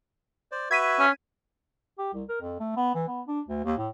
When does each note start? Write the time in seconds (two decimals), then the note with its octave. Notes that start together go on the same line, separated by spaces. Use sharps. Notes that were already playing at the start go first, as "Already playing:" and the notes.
0.52 C5 D5
0.71 F#4 B4 E5 G#6 B6 D#7
1.00 C#4
1.98 G4
2.13 C2
2.29 A#4
2.42 F2
2.60 A3
2.76 B3
2.95 E3
3.08 B3
3.28 D4
3.48 D2
3.64 D#2
3.78 A2